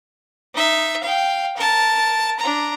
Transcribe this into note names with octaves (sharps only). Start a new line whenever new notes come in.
D#4 E5
F5 G5
A#4 A5
D4 A#5